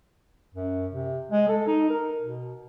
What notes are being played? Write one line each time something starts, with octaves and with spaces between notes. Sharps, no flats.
F#2
C3
G#3
A4
D#4
A#4
B2